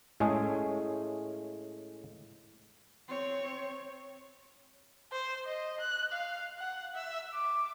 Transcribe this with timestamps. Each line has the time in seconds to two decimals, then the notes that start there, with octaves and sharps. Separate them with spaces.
0.20 A2 G#3 A3 C#4 G#4
3.09 C4 C#5
5.12 C5
5.45 D#5
5.81 F#6
6.12 F5
6.59 F#5
6.95 E5
7.34 D6